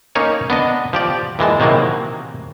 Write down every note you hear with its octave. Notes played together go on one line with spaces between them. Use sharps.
A#3 C#4 D#4 C#5 G#5
B3 D4 D#5
F3 G4 D5
A#2 E3 G#3 A5
C3 D#3 E3 F#3 A#3